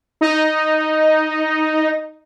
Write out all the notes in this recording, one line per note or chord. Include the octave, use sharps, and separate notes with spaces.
D#4 D#5